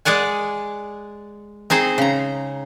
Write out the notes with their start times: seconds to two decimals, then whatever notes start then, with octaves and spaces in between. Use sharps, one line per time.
0.05 G#3 G#4 D5 F#5 G#5
1.70 C4 D#4 G#4 C5
1.98 C#3 A#5